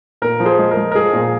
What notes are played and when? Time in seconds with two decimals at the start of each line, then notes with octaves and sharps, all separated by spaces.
0.22 A#2 A#4
0.40 F3
0.45 G#4 C5
0.59 G#3
0.71 A#4
0.77 G#3
0.91 A#4
0.95 F3 G#4
1.13 A#2